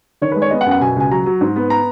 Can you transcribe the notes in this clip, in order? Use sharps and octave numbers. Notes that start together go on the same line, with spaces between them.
D#3 C#5
B4
G#3
C#5
B3 D#5
F#5
F#2
F#5
B2 G#5
C#2 G#5
F#3 A#5
F#3
G#2
B3
A#5